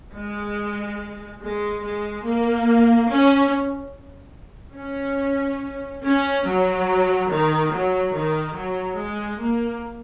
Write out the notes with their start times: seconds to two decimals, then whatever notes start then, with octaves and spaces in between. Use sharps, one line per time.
0.13 G#3
1.39 G#3
1.82 G#3
2.23 A#3
3.09 C#4
4.76 C#4
6.03 C#4
6.46 F#3
7.30 D#3
7.71 F#3
8.15 D#3
8.57 F#3
8.98 G#3
9.40 A#3